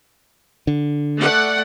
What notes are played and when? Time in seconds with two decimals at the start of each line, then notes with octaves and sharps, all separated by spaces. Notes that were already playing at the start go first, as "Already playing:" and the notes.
0.67 D3
1.17 A3 D5 F#5